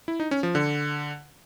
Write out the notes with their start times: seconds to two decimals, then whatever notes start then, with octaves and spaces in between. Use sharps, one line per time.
0.08 E4
0.20 D#4
0.31 C#4
0.43 F3
0.55 D3